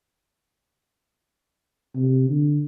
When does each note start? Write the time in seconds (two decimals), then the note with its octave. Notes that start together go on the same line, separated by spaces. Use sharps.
1.96 C3
2.30 D3